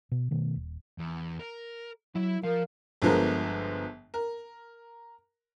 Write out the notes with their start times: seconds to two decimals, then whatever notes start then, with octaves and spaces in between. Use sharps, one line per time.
0.11 B2
0.31 B2 D#3 A3
0.56 D#1
0.98 E2
1.39 A#4
2.15 F#3 E4 E5
2.43 F3 A#4 F5
3.02 G1 D3 F3 G#3 B3 A#4
4.14 A#4